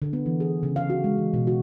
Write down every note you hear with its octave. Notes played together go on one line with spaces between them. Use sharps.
D3
B3
E3
G#4
C#3
F5
F#4
G#3
E3
B2
F#4